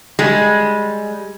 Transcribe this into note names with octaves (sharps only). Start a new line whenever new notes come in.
G3 G#3